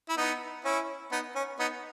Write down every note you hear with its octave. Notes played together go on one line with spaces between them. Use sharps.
E4
B3 D#4
C#4 E4
B3 D#4
C#4
B3 D#4